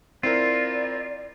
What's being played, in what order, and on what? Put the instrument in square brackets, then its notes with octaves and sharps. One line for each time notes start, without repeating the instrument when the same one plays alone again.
[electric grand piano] C4 E4 A#4 [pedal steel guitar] F4 [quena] D5